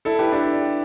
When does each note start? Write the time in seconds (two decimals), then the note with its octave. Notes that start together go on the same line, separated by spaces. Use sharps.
0.05 E4 A4
0.19 G4 B4
0.32 D4 G4